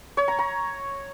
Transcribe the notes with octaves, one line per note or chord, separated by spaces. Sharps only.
C#5
A#5
A#5